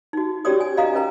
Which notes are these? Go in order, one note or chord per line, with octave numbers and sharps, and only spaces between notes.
D#4 F#4
C#4 F#4 G4 C#5 D5 D#6
G#5
D#5 F5 A#5 D#6
C#4 B4 A#5